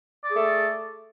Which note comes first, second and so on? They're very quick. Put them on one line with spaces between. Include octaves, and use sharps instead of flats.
D5 G#4 A3